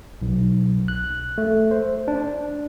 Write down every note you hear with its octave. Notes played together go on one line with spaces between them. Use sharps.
B1
F#6
A3
C5
D4